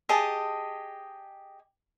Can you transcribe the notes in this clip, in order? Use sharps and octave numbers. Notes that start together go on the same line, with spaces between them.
G4 G#4 D#5 A5